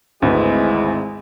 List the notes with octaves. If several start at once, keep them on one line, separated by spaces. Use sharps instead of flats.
G#1 D2 G#3 E4 B4